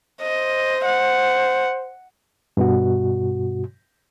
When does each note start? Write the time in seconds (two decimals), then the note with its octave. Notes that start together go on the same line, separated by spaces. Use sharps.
0.22 C5 D#5
0.85 F#5
2.57 G2 B2 F#4